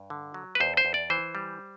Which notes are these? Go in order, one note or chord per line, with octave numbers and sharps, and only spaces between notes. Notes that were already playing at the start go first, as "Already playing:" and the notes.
Already playing: G2
D3
F#3
B4
E2 C5
C5
E2
D5
E3 C5
G3